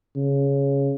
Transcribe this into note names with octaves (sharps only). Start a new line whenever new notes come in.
C#3